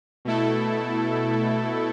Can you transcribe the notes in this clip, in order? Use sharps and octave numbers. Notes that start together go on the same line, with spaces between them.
B2 A3 E4 A4